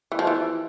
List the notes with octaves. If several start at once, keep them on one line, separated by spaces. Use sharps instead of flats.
E3
F3
E3